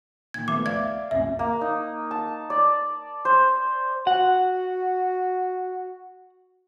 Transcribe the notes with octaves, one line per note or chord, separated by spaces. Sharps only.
A#2 D#3 G#6
F3 A3 B3 D6
D5 E5 F5 G#6
C2 F#2 A#2 E5
A#3
D#4
A5
D5
C5
F#4 F#5